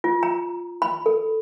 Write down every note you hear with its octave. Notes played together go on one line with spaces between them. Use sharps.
F4
A#5
B5
A4